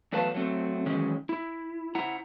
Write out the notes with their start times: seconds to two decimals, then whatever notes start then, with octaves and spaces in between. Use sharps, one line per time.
0.12 E2 F#3 A3 B4 F5 A5
0.34 F#3 A3 C4
0.86 D#3 E3 F#3 G#3 C#4
1.29 E4
1.95 E4 F#5 A#5